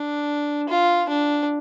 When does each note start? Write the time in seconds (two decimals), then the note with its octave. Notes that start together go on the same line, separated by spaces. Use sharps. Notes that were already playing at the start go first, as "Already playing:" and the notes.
Already playing: D4
0.69 F4
1.09 D4